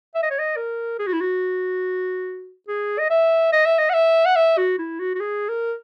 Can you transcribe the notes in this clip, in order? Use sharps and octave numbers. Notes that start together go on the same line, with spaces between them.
E5
D#5
C#5
D#5
A#4
G#4
F#4
E4
F#4
G#4
D#5
E5
D#5
E5
D#5
F#5
E5
F#5
E5
F#4
E4
F#4
F#4
G#4
A#4